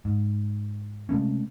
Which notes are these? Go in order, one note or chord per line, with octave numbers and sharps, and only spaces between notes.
G#2
C3 G#3 A3 C#4